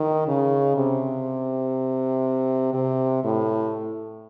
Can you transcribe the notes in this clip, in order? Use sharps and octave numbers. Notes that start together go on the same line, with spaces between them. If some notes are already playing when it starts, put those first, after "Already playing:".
Already playing: D#3
C#3
C3
C3
A2